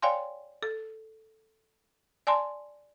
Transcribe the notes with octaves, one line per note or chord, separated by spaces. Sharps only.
C#5 D5 F5 G5 G#5 C6
A4
D5 G#5 A5 C6